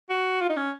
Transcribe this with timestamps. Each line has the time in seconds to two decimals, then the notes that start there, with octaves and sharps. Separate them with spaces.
0.10 F#4
0.41 F4
0.49 D#4
0.57 C#4